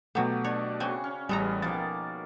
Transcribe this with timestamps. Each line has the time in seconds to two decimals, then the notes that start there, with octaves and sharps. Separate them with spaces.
0.15 B2 F#3 A3 B3 G4
0.44 D4 C#5
0.80 C#3 C4 F#4 G#5 C#6
1.04 C#4
1.29 A1 G3 G#3 B3 G#4 A4 A#5
1.62 B2 D#3 F3 A#3 A6